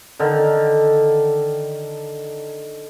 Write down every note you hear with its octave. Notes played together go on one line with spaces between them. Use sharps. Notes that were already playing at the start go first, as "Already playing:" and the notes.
D3 D#3